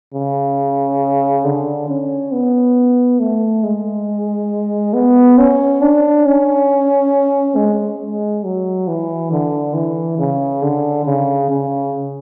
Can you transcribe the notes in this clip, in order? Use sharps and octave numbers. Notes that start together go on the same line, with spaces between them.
C#3
D3
C#4
B3
A3
G#3
B3
C#4
D4
C#4
G#3
G#3
F#3
E3
D3
E3
C#3
D3
C#3
C#3